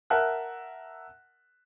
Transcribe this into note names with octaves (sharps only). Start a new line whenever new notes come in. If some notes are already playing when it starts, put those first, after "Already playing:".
A#4 E5 F#5 A5 F#6